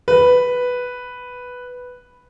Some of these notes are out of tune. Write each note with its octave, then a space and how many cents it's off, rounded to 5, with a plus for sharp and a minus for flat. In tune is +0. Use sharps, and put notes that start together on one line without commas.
B4 +0